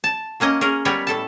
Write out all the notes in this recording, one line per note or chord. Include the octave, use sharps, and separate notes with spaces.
A5
F#3 A#3 C#4 D#5
C#4 G#4 A#4
G3 B3 A#4 B4 C#5
A2 A4 A5